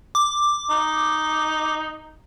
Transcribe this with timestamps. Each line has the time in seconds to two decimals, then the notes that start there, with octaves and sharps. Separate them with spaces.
0.15 D6
0.70 D#4